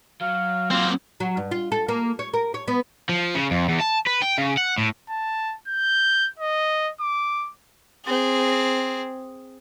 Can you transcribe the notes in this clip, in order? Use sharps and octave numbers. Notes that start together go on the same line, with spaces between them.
F#3 F5
A#3 C4 F4
F#3
G2
F4
A4
A#3
C#5
A#4
C#5
B3
F3
C#3
F2
E2
A5
B4
G5
C#3
F#5
A2
A5
G6
D#5
D6
C4 G#4